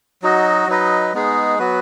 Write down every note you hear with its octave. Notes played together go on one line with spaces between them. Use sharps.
F#3 D#4 F#4 D#5
F#3 D#4 B4 D#5
G#3 B3 D#4 G#4
F#3 B3 F#4 B4